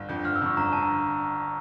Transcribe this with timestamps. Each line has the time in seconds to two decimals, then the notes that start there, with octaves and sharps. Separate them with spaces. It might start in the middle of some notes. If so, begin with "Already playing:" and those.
Already playing: G1
0.09 F2 D3 G6
0.24 G1 F6
0.36 E6
0.41 F2 D3 C#6
0.57 G1 A#5
0.73 D3 A5